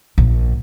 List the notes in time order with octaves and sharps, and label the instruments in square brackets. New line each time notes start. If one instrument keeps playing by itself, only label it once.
[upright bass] A#1